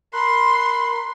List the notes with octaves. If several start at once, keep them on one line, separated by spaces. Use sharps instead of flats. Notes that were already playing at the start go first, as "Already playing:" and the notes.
A#4 B5 C6 F#6